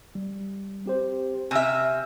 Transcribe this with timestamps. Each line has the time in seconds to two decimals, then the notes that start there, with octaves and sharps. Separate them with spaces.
0.15 G3
0.86 C4 G4 C5
1.51 C3 E5 G#5 E6 F6